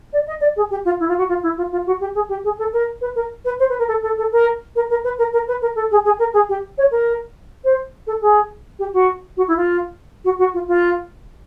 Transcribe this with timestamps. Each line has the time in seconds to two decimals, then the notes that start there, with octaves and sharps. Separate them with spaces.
0.12 D5
0.27 D#5
0.40 D5
0.56 G#4
0.70 G4
0.85 F4
0.99 E4
1.08 F4
1.18 F#4
1.28 F4
1.43 E4
1.57 F4
1.71 F4
1.86 F#4
2.00 G4
2.15 G#4
2.28 G4
2.44 G#4
2.58 A4
2.73 A#4
3.01 B4
3.15 A#4
3.45 B4
3.59 C5
3.69 B4
3.78 A#4
3.88 A4
4.02 A4
4.17 A4
4.32 A#4
4.75 A#4
4.90 A#4
5.04 B4
5.18 A#4
5.33 A#4
5.47 B4
5.61 A#4
5.75 A4
5.91 G#4
6.04 G#4
6.19 A#4
6.33 G#4
6.49 G4
6.77 C#5
6.91 A#4
7.64 C5
8.06 A4
8.21 G#4
8.79 G4
8.93 F#4
9.37 F#4
9.47 E4
9.56 F4
10.24 F#4
10.38 F#4
10.53 F4
10.67 F4